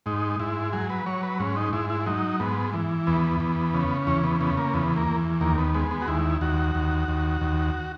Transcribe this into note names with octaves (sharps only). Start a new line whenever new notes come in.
G#2 D#4
G#2 E4
F#3 G#4
B4
F#3 C#5
B4
G#2 C#4
D#4
G#2 E4
E4
F#3 D#4
G#2 B3
E3
E2 B3
E2
C#3
E2 C#4
B3
C#3 B3
A#3
E2 B3
A#3
E2
D#2 A#3
B3
G#3 B3
B3
F#4
D#2 E4
D#2 F#4
D#2
D#2
D#2